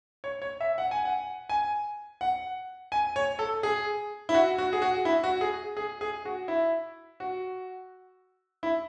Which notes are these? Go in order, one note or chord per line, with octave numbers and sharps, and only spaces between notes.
C#5
C#5
E5
F#5
G#5
F#5
G#5
F#5
G#5
C#5
A4
G#4
E4
F#4
F#4
G#4
F#4
E4
F#4
G#4
G#4
G#4
F#4
E4
F#4
E4